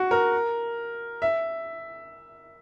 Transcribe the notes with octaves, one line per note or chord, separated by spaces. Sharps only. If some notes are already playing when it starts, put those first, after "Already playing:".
Already playing: F#4
A#4
E5